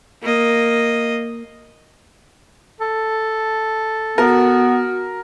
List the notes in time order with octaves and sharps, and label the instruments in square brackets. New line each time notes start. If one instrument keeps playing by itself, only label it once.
[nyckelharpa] A#3 D#5
[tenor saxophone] A4
[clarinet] B3 [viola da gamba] F#4 [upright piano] A#4